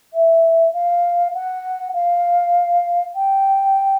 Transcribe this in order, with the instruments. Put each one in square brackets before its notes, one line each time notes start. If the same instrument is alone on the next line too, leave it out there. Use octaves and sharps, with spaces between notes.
[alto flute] E5
F5
F#5
F5
G5